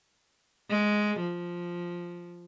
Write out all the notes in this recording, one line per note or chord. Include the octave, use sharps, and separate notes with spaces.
G#3
F3